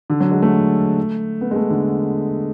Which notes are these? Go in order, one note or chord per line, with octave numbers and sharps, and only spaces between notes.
D3
F#3
G#3
A3
B3
G#3
A3
D3